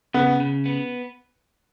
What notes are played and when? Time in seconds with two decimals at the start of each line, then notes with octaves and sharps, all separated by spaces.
0.14 C#3 B3
0.40 C#3
0.65 B3